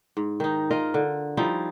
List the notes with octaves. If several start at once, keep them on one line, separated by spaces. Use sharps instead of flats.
G#2
D#3 D#4
F4 A#4 D#5 F5
D3
F3 G3 D#4 E4